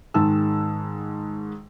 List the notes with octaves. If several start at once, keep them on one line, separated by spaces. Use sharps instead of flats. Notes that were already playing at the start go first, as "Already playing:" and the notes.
G#2 D#3 G#3 A5 E6